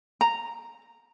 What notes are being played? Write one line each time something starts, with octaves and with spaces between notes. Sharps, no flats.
A#5